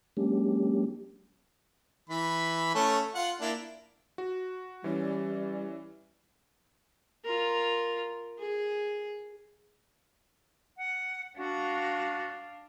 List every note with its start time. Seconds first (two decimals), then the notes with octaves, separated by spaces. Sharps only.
0.17 F#3 G#3 A#3 C#4 D4 G4
2.10 E3 B5
2.75 A3 C#4 A4
3.15 F4 F#5
3.41 A#3 D4 E4
4.18 F#4
4.84 E3 G3 C#4 D5
7.25 F4 A#4
8.39 G#4
10.77 F#5
11.37 D4 F#4 F5